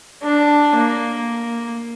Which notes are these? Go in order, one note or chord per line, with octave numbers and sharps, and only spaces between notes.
D4
A#3